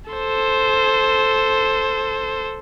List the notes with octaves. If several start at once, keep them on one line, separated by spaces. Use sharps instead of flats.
A4 C5